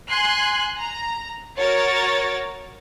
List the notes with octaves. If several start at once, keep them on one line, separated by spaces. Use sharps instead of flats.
G#5 C6 F#6
A#5
F#4 A#4 C#5 A6